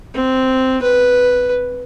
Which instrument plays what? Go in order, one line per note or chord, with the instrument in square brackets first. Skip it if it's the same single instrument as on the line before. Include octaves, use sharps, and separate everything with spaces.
[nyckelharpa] C4
B4